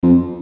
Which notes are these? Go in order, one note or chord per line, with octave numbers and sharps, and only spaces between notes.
F2